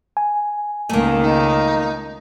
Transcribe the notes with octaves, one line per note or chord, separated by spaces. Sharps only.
G#5
C#2 D#3 A3 A#3
D#4